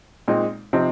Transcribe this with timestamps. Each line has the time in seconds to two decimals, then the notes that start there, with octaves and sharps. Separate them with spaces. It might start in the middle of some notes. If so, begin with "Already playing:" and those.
0.28 A#2 G#3 C4 D#4
0.73 C3 F3 C4 D#4